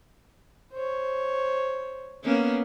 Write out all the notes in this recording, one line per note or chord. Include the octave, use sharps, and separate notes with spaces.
C5 C#5
A#3 B3 C#4